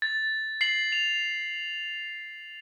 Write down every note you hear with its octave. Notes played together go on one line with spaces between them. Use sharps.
A6
C7 F#7
F7